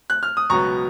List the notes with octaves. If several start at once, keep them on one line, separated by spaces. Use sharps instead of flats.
F#6
F6
D#6
C#2 B2 F#3 B3 A#5 C#6